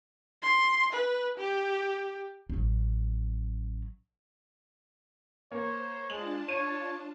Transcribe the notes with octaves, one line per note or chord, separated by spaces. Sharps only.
C6
B4
G4
A1 F#3
A#3 C5 C#5
G#3 D4 F4 A5 F#7
C#5 D#7